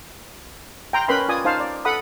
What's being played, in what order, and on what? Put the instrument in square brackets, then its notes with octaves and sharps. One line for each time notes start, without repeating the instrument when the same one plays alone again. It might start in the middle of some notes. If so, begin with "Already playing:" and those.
[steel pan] G5 A#5 C6
C#4 A#4 B4 G5 B5 C6
F4 D5 G#5 D#6
D#4 C5 F5 A5
D5
A4 F#5 B5 D#6